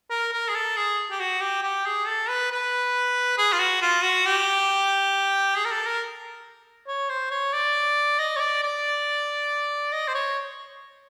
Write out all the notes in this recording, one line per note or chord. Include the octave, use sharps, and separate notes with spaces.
A#4
A#4
G#4
A4
G#4
G4
F#4
G4
G4
G#4
A4
B4
B4
G#4
F4
F#4
F4
F#4
G4
G#4
A#4
A4
A#4
C#5
C5
C#5
D5
D#5
C#5
D5
D5
D#5
C5
C#5